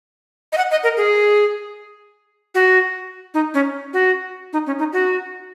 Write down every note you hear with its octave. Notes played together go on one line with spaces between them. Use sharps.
D#5
F#5
D#5
A#4
G#4
F#4
D#4
C#4
F#4
D#4
C#4
D#4
F#4